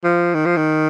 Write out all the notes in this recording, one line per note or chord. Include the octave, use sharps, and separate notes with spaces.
F3
D#3
F3
D#3